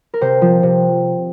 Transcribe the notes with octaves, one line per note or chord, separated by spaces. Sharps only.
A#4
C3 C5
F3
C3